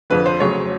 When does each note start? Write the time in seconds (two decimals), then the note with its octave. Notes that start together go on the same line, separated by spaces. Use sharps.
0.10 F2 D3 F3 B4
0.26 C5
0.40 F2 C#3 F#3 A3 C#5